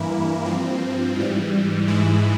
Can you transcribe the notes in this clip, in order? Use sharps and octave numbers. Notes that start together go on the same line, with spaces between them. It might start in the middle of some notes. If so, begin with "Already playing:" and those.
Already playing: G2 E3 A#3 E4
G2 F3 C4
G#2 E3 G3
G#2 E3 G#3 E4